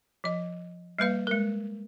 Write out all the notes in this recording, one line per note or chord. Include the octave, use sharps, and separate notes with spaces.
F3 D#5
G3 A#3 B4 F5
G#3 A#4